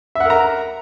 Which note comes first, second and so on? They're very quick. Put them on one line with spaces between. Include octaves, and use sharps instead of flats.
E5 F#5 A#4 A#5